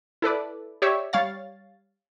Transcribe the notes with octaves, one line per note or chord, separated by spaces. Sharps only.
E4 A4 B4 D5
G4 C#5 D5 E5
G3 C#5 F5 A6